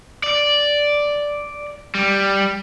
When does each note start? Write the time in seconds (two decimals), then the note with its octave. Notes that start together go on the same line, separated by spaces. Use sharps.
0.24 D5
1.95 G3